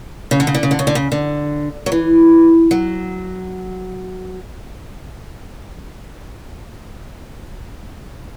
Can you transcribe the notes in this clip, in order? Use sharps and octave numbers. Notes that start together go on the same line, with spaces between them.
C#3
D3
C#3
D3
C#3
D3
C#3
D3
C#3
D3
F#3
E3
F#3